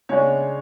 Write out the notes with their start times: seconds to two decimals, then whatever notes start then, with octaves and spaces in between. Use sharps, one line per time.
0.09 C#3 G#3 D4 C#5